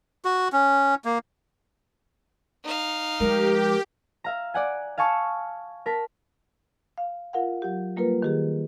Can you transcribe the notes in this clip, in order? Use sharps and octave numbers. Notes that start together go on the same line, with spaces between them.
F#4
C#4
A#3
D#4 F5
F3 G#3 G4 A#4
E5 F5 A#5
D5 F#5 G#5
F5 G#5 A5 C#6 E6
A#4 A5 B6
F5
F4 A#4 F5 F#5
F#3 G4
G3 A#3 F4 A#4 B4
D#3 G4 G#4